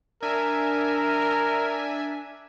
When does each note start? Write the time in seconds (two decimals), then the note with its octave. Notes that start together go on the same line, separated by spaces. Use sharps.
0.23 D4 A#4 E5 G#5